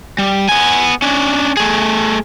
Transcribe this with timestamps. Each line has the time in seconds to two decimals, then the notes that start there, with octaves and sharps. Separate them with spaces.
0.19 G3
0.49 B3 G#5
1.02 C#4 D4
1.57 A3 G#4